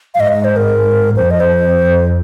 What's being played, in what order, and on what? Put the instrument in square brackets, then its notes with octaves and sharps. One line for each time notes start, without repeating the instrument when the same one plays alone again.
[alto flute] F5
[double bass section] G#2 [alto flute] D#5
[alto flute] D#5
C5
A#4
[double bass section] F2 [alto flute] C5
[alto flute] D#5
C5